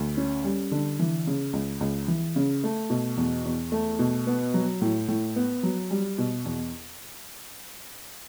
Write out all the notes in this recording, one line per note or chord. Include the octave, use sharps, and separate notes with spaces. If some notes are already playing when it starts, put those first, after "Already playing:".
Already playing: D2
C#4
G3
D3
E3
C#3
C#2
C#2
E3
C#3
A3
B2
E2
E2
A3
B2
B3
F#3
A2
A2
B3
F#3
G3
B2
E2